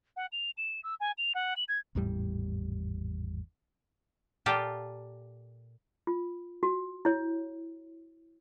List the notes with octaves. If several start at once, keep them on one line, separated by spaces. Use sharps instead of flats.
F#5
F7
E7
E6
G#5
F7
F#5
F#7
G#6
G#1 E2 A2 G3
A#2 F4 G4 A4
F4
F#4
E4 C#5